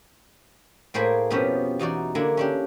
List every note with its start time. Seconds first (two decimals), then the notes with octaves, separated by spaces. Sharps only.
0.94 A2 A#3 G#4 C5 G#5 B5
1.30 F2 B2 F3 B3 C#4 G4
1.79 E2 D#4 F#4 D5
2.15 D3 A#3 E4 G#5
2.37 C#4 D4 G4